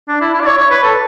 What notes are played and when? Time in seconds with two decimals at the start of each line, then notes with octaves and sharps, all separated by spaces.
0.09 D4
0.21 E4
0.34 E4
0.41 D5
0.46 C#5
0.58 C#5
0.71 B4
0.83 A4